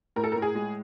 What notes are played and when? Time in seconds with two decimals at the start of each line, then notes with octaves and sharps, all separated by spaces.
0.16 A2 A#4
0.24 A4
0.32 A2 A#4
0.42 G#4
0.55 G#3